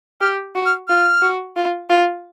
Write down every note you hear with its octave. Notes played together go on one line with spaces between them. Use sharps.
G4 F6
F#4
F6
F4 F6
F#4
F4
F4